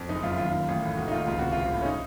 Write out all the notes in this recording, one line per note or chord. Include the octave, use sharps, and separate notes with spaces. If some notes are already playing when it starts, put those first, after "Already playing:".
Already playing: F2
F#1 D#4
F#2 F4
D#2 F4
D#3
A1
A2
F1 F#4
D#4
D#2 F4
C#2 F4
C3 F#4
A#1 F4
A2
C#4
D#4